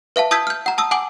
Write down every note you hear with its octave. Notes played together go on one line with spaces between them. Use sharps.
B4 E5 F5 A5
A5 D#6 E6 G6 G#6 B6
F6 G6
F#5 A#5
A5 D#6 E6
F#5 G#5 D6 D7 F#7